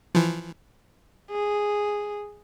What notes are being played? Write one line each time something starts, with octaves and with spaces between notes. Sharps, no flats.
E3 F3
G#4